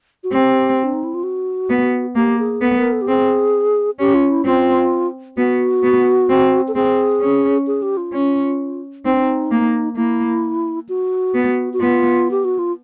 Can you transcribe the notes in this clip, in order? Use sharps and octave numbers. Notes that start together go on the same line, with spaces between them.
F#4
C4 G4
D4
D#4
E4
F4
F#4
B3
A#3 G4
G#4
B3 A4
A#4
A4
G4
C4 G#4
C#4 G4
F4
E4
C4 F4
B3 F#4
B3
C4
A4
C4 G#4
C#4
G#4
G4
F4
C#4
C4 D#4
D4
D#4
A#3
A#3 E4
F#4
B3
F#4
B3 F4
G4
F#4
F4